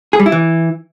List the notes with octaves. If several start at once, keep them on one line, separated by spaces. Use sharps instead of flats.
G#4
G3
E4
E3